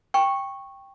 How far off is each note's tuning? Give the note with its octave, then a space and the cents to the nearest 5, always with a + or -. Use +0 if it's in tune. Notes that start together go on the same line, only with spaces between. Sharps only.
G5 +10 C#6 -10